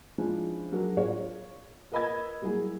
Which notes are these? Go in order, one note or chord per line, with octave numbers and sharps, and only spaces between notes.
F3 G#3 C#4 D4 E4 F4
F#3 D4 F#4 G#4 A#4
F4 C#5
A#4 B4 D#5 B5 E6 G#6
F#3 G3 A#3 E4 G#4